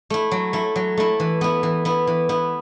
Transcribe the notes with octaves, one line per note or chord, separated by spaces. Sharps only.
A3 E4
F#3
A3 E4
F#3
A3 E4
E3
B3 E4
E3
B3 E4
E3
B3 E4